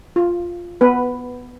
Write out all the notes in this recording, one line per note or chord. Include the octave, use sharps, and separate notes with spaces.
F4
B3 B4